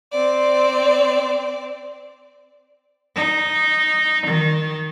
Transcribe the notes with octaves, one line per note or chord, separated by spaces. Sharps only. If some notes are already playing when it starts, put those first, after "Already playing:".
C4 D5
D#4
D#3